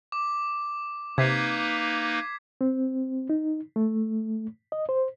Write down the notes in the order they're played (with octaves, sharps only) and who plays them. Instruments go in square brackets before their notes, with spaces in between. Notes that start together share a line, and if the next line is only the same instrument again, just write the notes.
[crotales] D6
[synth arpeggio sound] C3 [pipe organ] A#3 D#4 B4 [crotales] G#6 B6 C7
[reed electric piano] C4
D#4
A3
D#5
C5